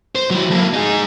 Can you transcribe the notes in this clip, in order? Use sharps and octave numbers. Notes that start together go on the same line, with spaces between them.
C5
F#3 E4
A#3 A4
D#4 G#4